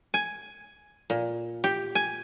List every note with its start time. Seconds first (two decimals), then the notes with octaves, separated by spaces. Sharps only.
0.14 G#5
1.10 A#2
1.64 G4
1.95 G#5